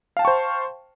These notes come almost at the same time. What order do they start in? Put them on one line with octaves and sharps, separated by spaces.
F5 A5 G5 C#6 C5